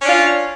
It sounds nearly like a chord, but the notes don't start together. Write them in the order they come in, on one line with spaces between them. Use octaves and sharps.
C#4 D4 F4